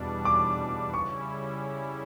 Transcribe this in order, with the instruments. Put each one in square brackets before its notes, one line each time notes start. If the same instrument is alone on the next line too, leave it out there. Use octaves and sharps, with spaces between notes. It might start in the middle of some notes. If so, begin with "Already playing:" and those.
Already playing: [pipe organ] E2 B2 G3 D4
[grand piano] D6
[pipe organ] C#3 G3 C#4 E4 [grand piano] C#6